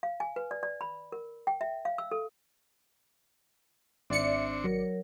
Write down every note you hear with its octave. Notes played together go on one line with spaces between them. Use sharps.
F5
G#5
B4
D5
D5
B5
A#4
G5
E5
F5
E6
A4
G#1 C4 D4 D5 E5 C#7
F#3 A#4